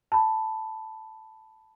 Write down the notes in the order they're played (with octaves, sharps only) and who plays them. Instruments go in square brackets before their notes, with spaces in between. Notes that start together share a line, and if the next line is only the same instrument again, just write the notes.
[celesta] A5 B5